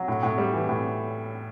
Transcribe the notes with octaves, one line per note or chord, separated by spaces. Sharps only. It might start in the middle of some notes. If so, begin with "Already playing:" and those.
Already playing: F#3
A2
A2
G3
E3
A2